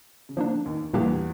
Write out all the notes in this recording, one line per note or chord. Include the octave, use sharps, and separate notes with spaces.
C#3
D3 F3 A#3 D4
D#2 D#3
E2 A#2 E3 G3 A#3 D4 G4